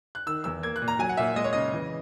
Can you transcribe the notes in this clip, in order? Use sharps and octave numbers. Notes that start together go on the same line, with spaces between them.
F#6
D#3 E6
E2 E6
A#3 G#6
F#6
A#2
A#5
F#3 G#5
F#5
A#2 E5
G#3 D#5
C#5
C#3 D#5
E3